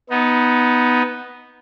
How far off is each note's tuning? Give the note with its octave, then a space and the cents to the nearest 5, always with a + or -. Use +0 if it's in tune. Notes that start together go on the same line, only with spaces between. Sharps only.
B3 +0 D#4 +15